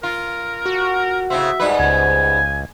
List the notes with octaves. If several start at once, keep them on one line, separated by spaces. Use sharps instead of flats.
F4 A#4
F#4
A2 C#3 C4 E5
G#2 G3 B4
C#2 G#5